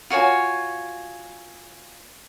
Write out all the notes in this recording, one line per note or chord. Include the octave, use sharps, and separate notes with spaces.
F4 F#4 C#5 G#5